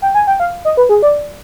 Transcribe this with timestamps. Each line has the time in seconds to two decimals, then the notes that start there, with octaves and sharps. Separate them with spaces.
0.02 G5
0.14 G#5
0.27 G5
0.40 F5
0.65 D#5
0.77 B4
0.89 G#4
1.02 D5